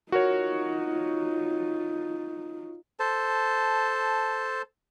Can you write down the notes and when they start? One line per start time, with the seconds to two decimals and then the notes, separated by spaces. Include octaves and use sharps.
0.12 D#4 F4 F#4 A#4 C#5
3.00 A4 C5 A5